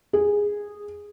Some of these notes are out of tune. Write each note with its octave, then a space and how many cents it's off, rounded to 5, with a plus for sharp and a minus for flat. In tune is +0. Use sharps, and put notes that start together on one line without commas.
G#4 -10